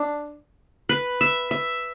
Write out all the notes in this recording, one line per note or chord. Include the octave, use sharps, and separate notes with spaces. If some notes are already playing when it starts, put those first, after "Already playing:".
Already playing: D4
B4
E5
E5